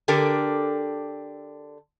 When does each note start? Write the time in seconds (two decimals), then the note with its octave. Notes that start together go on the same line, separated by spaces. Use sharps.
0.08 D3 D4 G4 A4 A#4